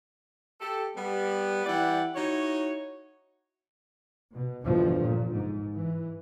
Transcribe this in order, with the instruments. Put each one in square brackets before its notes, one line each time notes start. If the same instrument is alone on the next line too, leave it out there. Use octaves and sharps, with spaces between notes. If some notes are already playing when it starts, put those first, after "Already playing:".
[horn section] G4 A4
G3 B3
E3 G3 E4 D5 F#5 G5
D#4 E4 F#4 C#5
[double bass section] B2
G1 E2 G2 B2 F3
A#2
G#2
E3